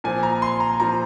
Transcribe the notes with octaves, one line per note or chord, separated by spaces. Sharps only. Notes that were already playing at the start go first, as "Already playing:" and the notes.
A#2 F3 C4 G#5
A#5
C6
A#5
A#2 F3 C4 A#5